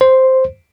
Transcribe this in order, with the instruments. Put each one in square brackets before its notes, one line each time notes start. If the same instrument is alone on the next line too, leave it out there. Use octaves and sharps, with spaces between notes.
[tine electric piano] C5